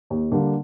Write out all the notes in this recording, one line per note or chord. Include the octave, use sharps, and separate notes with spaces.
D#2
D3 G3 A#3